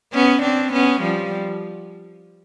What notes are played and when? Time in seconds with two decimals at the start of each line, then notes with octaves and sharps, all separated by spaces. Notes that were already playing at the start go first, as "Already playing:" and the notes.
0.13 B3 C#4
0.42 C4 D4
0.72 B3 C#4
1.02 F3 G3